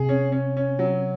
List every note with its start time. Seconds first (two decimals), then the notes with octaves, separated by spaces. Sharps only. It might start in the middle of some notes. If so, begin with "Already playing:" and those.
Already playing: C3 G#4
0.09 C#4
0.32 C#4
0.57 C#4
0.79 F#3